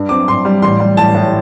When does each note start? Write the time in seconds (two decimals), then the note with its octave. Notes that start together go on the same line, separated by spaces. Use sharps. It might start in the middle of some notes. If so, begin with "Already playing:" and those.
Already playing: G2
0.09 C4 D6
0.28 G2 C6
0.45 G3
0.62 A1 C6
0.80 G3
0.97 A1 A5
1.15 A2